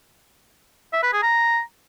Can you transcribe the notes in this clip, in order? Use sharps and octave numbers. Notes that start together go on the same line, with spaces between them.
E5
B4
G#4
A#5